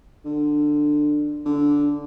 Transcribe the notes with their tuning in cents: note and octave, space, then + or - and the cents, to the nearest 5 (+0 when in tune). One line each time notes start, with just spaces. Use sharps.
D3 +15
D3 -10